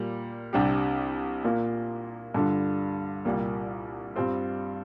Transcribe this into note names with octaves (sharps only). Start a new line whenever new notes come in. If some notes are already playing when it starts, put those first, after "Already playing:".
Already playing: A#2 G3 A#3
C2 C3 G3 D4 G4
A#2 A#3 F4
G2 D3 G3 D4 F4
C2 A#2 G3 A#3
G2 G3 C4 F4